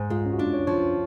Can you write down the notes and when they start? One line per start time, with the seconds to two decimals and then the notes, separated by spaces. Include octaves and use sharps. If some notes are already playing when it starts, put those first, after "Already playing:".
Already playing: G#2
0.10 G#3 F4
0.26 C#4
0.33 F#4
0.38 D4 F4
0.54 C#5
0.67 F3 C#5